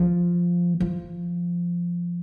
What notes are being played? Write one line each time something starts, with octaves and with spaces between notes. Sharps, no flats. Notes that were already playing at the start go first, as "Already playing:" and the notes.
Already playing: F3
F3